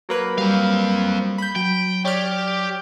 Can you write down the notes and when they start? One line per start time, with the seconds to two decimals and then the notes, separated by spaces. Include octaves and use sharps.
0.09 F#3 A#3 B4
0.38 G3 C4 F5
1.38 B5 G6
1.56 F#3 G5
2.05 G4 C#5 D5 F6